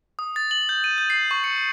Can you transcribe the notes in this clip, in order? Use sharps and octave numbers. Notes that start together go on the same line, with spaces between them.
D#6
A6
F#7
G6
D#7
G6
C7
C#6
C#7